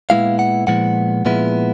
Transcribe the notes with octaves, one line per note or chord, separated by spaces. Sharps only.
A#2 F3 G#3 B3 E4 F5
F#5
A#2 F3 G#3 B3 E4 F#5
A#2 F3 G#3 B3 E4